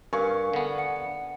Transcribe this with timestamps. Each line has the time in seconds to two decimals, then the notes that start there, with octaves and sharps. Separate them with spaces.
0.13 G2 A#4 F5 G#5 C#6
0.53 D3 B3
0.78 F#5 C#7